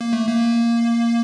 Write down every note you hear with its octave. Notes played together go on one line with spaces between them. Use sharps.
A#3
A3
A#3